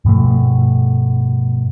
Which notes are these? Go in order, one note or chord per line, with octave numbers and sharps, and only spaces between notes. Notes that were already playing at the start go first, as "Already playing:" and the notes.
G2 B2 F3 A3